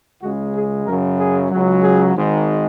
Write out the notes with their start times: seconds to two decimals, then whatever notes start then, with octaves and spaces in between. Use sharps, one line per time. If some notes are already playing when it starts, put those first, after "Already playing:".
0.22 C#2 C#3 G#3 F#4
0.55 G#4
0.86 F#2 C#3 F#3 A#4
1.18 G#4
1.50 C#2 C#3 F#3
1.82 G#4
2.13 G#1 G#2 D#3 G#3